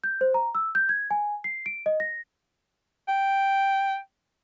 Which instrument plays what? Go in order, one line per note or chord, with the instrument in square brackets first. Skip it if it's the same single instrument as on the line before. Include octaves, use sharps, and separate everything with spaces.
[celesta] G6
C5
A#5
E6
G6
G#6
G#5
C7
D7
D#5
A#6
[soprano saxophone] G5